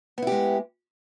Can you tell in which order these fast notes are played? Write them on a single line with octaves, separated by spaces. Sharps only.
B3 E4 G4 G#3